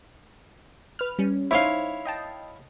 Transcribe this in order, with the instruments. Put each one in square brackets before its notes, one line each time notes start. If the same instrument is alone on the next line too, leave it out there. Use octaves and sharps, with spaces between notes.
[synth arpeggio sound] B4 F6
G3 C#4
[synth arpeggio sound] D#4 C5 [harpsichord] E4 C#5 F5
[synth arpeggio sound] D#5 G5 A5